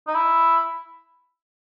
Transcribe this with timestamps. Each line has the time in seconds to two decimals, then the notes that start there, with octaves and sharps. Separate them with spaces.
0.07 D#4
0.15 E4